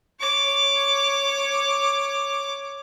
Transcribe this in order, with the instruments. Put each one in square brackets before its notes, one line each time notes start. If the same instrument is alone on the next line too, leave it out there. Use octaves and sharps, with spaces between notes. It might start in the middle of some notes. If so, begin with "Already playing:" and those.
[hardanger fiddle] C#5 D6